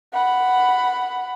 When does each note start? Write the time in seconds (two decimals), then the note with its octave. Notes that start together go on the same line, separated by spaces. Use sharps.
0.13 F#5 B5